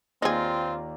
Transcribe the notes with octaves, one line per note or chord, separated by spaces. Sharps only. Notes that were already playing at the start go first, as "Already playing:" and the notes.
D#2 C4 D#4 F4 G#4 D5 A#5